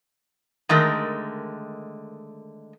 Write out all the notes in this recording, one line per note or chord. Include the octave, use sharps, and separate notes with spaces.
D3 D#3 G#3 A3 A#4